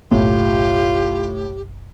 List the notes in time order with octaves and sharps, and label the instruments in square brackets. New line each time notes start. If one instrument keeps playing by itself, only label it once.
[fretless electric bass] F#1 B1 [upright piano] A2 [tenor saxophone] F4 [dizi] G4